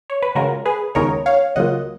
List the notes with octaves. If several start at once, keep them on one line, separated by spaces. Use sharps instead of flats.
C#5
B4
C#3 G#3 C#4 F4 F#4 A#4
G#4 B4
D#2 C#3 G#3 B3 D#4 A#4 C#5
C#5 F5
C#2 C#3 F#3 A#3 F4 D#5 F#5